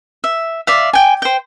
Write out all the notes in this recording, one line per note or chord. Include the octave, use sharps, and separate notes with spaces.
E5
D5 E5 F5
G5 G#5
C5 G5